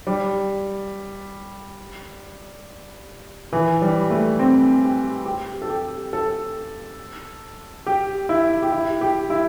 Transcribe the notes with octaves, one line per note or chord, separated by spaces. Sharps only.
G3
E3
G3
A3
C4
G4
G4
A4
G4
A4
G4
E4
G4
E4
G4
E4